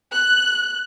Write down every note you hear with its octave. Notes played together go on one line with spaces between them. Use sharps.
F#6